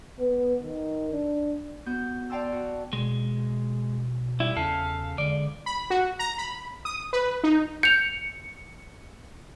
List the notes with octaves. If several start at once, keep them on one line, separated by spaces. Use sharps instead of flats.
B3
D#3
D4
B3 F#4 G6
D5 F5 G5 A5 C6 E6
F#4
B2 G#3
G3 E4
E2 C#3 A4 F5
D3 G#3 D5
B5
F#4
A#5
B5
D#6
B4
D#4
G6 C#7 F7